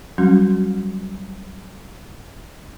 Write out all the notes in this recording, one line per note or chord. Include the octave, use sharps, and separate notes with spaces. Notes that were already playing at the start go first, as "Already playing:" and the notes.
F#3 G3 C#4 F#4